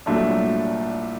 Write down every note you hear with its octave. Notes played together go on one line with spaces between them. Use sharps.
C2 A#2 F#3 A3 D4